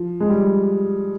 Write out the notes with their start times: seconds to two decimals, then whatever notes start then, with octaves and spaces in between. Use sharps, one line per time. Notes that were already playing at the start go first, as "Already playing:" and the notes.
Already playing: F3
0.20 G#3
0.29 G3